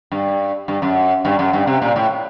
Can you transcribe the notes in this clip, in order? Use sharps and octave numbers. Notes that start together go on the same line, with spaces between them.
G2
G2
F#2
G2
F#2
G2
C3
A#2
A2